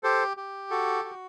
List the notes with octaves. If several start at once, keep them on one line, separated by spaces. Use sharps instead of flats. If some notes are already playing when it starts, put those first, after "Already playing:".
G4 A4 C5
G4
F#4 A4
F#4